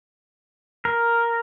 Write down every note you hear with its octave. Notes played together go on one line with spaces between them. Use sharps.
A#4